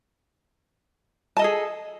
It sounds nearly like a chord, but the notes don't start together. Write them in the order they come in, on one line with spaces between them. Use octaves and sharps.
A5 D#5 A4 G#4